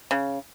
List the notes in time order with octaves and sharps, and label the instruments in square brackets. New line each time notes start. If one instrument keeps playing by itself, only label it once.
[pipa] C#3